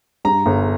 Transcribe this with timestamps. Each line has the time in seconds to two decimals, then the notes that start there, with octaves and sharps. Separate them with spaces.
0.25 G2 A#5
0.46 G1